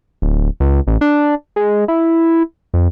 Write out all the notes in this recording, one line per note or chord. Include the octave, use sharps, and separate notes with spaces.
D1
C#2
A1
D4
G#3
E4
F2